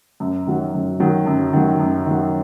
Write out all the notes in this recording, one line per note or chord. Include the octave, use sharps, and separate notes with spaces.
F#2
D#3 F#3
F#2
D#3 F#3
F#2
D#3 F#3
F#2
D#3 F#3